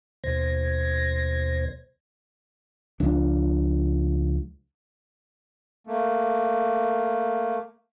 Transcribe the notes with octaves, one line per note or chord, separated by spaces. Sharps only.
D#2 B2 C5 G#6 A#6
C#2 F3 D4
A3 A#3